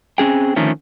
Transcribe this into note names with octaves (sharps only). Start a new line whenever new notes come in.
C4 C#4 G#4 G5
D3 D#3 F3 A3 C#4